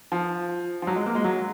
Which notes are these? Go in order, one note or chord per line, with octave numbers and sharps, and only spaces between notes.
F3
F3
F#3
G#3
A#3
G#3
F#3